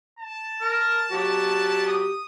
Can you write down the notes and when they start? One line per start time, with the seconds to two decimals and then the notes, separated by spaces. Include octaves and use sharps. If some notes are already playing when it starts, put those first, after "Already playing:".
0.19 A5
0.62 A#4 F6
1.11 F#3 G4
1.88 D#6